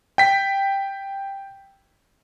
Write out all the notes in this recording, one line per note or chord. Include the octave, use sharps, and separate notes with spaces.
G5 B6